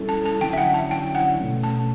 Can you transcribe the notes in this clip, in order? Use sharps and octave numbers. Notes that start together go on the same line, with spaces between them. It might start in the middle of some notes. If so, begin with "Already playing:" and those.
Already playing: G3 C#4 E4 A4
A5
A5
D3 F#3 C#4 E4 G5
E5
F#5
A5
G5
F#5
B2 A3 C#4
A5